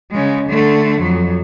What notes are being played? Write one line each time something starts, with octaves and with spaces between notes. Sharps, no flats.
C#3 G#3
D3 A3
F2 F#3